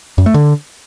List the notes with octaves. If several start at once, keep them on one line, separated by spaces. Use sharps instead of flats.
F#2
A3
D3